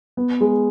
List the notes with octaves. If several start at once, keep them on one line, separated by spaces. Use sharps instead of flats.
B3
G#3